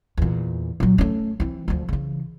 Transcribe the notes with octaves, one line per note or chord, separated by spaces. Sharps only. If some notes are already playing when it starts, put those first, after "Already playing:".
E2 A#2
A#2 F#3
A3 C#4
E3 C4
D2 F3
C#3 E3